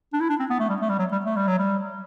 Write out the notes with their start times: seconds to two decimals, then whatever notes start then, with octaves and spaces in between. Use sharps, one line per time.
0.13 D4
0.20 E4
0.29 D4
0.40 C4
0.50 B3
0.60 A3
0.69 G3
0.81 A3
0.89 G3
0.99 F#3
1.12 G3
1.26 A3
1.37 G3
1.47 F#3
1.59 G3